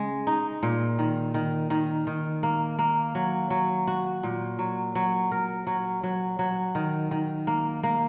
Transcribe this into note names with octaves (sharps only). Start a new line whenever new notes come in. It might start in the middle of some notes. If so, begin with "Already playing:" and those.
Already playing: C#3 G#3
D#4
A#2
D#3
D#3
D#3
D#3
A#3
A#3
F#3
F#3
F#4
A#2
F#3
F#3
A#4
F#3
F#3
F#3
D#3
D#3
A#3
A#3